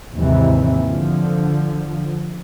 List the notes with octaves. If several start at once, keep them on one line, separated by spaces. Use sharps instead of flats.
D#2 G#2 C3 E3
D3 F3